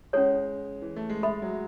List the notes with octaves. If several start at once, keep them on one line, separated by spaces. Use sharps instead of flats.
G#3 C#4 E4 A4 C#5
E3
A3
G#3
G#3 A4 E5 B5
F#3